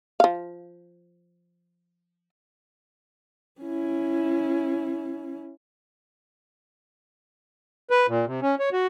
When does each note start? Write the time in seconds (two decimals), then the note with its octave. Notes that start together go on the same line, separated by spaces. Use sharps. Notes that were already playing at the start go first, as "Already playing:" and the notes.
0.20 F3 F5
3.61 C#4 E4
7.90 B4
8.08 A#2
8.26 C3
8.42 C#4
8.59 C#5
8.73 F#4